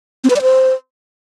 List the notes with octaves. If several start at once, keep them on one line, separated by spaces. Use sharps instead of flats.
C4
B4
D5
C5